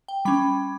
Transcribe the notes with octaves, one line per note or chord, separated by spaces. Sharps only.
G5
G3 C#4 B5